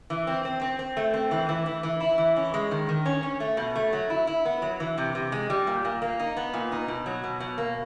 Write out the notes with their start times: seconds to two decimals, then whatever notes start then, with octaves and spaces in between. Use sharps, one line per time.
0.10 E3
0.27 C4
0.45 C4
0.61 C4
0.79 C4
0.97 A3
1.14 C4
1.31 E3
1.49 E3
1.66 E3
1.83 E3
2.00 E4
2.18 E3
2.36 C#4
2.54 G#3
2.71 D#3
2.89 D#3
3.06 C#4
3.23 C#4
3.40 A3
3.57 B2
3.76 A3
3.93 F#3
4.10 E4
4.27 E4
4.45 B3
4.62 F#3
4.80 E3
4.98 C3
5.15 C3
5.32 G#3
5.50 G3
5.67 A#2
5.85 A#2
6.02 A#3
6.20 D#4
6.37 B3
6.54 A#2
6.72 D#4
6.88 B2
7.06 F#3
7.24 B2
7.40 B2
7.58 A#3